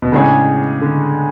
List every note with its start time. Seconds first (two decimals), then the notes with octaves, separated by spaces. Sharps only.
0.02 B2
0.12 A2 C#3 G#3 D4 G#4 C#5
0.81 D3